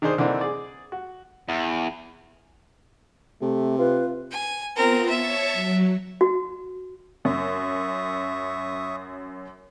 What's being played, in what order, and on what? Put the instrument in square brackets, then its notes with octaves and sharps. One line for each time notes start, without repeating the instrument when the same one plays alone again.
[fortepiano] D#3 D4 D#4 G#4 C5
D3 E3 A#3 C4 D4 D#4
G#4 D5
F#4
[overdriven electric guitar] E2
[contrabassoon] C3 [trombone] A3
[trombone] F4 [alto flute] B4
[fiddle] G#5
[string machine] B3 F4 [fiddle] C4 A#4
[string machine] C#5 A5 C#6 [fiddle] E5
[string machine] F#3
[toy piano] F#4
[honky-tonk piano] F#2 [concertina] E5 C#6 D#6